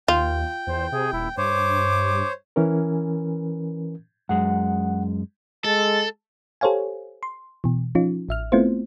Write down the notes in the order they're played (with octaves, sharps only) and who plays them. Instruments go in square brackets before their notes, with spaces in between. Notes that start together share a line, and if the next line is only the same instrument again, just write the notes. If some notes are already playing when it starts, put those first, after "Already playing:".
[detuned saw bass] D#2 [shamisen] F4 [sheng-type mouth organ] G5
[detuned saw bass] E2 [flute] C5
[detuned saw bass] C3 [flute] G#4
[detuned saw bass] D#1 [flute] E4
[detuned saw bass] G2 [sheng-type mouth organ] C5 C#5 [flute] D6
[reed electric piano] E3 C#4 A#4
[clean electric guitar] F#2 G#3 [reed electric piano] F#5
[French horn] G#3 [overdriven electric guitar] A4 [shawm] A5
[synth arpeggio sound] G4 A4 C5 C#5 F5 G#5
C6
B2 E3
F3 C#4 D#4 F4
A1 E5 F6
A3 B3 C4 E4 F4 C5